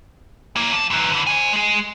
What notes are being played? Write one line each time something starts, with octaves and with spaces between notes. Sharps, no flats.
A#3 E4
F3 A5
F#2 E3
D3 E3
C5 G#5
G#3 G#4